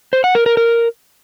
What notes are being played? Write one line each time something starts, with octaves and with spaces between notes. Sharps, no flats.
C5
F#5
A#4
A#4
A#4